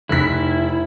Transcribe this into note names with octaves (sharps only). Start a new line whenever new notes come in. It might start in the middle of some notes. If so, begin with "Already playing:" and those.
F1 E4 B6